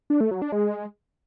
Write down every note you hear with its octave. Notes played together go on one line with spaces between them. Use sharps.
D4
A3
F#3
D4
G#3